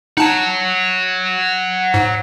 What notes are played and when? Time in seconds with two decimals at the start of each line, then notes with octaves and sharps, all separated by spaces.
0.17 D#4 C#5 F#5 A5
1.94 G#2